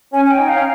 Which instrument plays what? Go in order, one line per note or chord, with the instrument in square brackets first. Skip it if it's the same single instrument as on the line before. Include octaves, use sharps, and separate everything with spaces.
[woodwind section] C#4 [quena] G#5
[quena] G#5
G5
[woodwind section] D#4
[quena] F5
[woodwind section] C#4